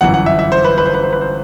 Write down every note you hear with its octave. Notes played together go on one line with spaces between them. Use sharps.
G1 F#2 E3 F#5
F#5
E5
E5
C5
B4
B4
C5
B4
C5
B4
C5